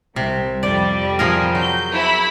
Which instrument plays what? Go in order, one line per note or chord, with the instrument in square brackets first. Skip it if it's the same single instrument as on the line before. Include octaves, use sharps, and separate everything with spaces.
[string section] C2 [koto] C3
[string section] F2 G3 [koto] D5
[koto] F3 G#4 A#4
[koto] F#3 [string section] G6
[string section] E4 B5